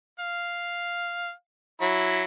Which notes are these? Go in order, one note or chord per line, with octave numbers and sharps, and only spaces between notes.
F5
F#3 E4